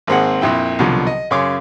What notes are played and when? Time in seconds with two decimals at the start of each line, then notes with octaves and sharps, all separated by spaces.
0.07 G#1 A#3 C4 G#4 F#5
0.41 A#1 F2 E4 G5
0.79 C2 B2 D3 F3 F#3
1.07 D#5
1.31 F#2 C#3 C#5 C6 D6